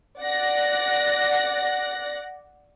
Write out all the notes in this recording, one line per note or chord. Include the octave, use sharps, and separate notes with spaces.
D5 F#5 F#6 A#6